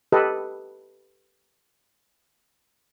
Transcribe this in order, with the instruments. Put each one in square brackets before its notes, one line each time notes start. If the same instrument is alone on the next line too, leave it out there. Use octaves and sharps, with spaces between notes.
[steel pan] G4 A4 B4 D#5